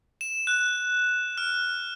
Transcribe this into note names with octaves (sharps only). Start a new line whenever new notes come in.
E7
F#6
F6